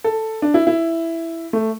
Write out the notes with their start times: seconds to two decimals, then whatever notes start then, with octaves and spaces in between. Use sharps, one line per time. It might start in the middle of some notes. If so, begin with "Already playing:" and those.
0.04 A4
0.42 D4
0.54 E4
0.67 E4
1.53 A3